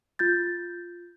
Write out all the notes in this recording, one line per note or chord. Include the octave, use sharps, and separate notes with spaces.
F4 G6 A6